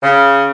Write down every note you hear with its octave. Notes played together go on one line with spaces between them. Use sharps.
C#3